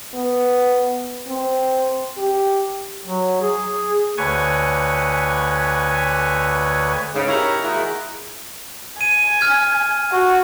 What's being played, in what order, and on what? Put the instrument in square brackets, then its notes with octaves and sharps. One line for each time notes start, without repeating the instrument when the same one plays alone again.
[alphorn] B3
C4
G4
[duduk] F#3
G#4
[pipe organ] D2 D3 B4 C#5 G#5 C#6
[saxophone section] G#2 C#3
D#4 E4 G4 A#4 C#5
D#3 G#3 A#3 D#4 E4 F#4
[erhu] G#5 [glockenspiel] D#7
[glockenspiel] F6 G#6
[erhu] F#4